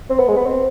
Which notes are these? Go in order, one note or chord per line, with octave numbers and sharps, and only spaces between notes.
C4
B3
G#3
B3
C4